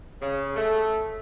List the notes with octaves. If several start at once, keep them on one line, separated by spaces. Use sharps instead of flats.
C#3
A3